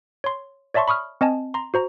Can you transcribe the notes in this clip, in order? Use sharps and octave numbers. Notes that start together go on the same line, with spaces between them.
C#5 C6
C#5 D5 E5 A5 C6 C#6
B5 C#6 D#6 F6
C4 D#5 G#5 A5
A#5 C6
F#4 C5 A#5